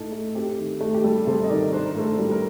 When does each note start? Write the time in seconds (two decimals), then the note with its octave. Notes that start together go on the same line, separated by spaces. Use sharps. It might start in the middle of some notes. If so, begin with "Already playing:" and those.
Already playing: A2 D#4 A4
0.12 A3
0.35 C4 G4
0.58 D#3
0.81 A3
0.94 G4
1.04 G3 A4
1.27 C3 A4 C5
1.44 D#5
1.49 D#3 A#4 D5
1.73 D4 C5
1.85 A#4
1.95 A2 A4 C5
2.19 G3
2.31 A#4